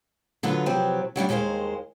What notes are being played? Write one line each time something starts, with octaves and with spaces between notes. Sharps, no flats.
D3 F#3 B3 F4 B4
C3 F3 F#3 C4 G4 B4
F#3 G3 D4 E4
D#2 D#3 G#3 C5 F5